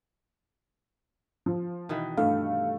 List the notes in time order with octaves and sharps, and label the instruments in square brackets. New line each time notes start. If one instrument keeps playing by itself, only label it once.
[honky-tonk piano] F3
[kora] B2 D#3 E3
[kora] G2 [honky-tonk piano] A3 [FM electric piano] F5